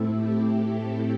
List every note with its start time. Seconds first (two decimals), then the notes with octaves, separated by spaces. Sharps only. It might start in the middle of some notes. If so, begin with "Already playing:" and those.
Already playing: A2 A3 C4 E4 A4
0.13 G4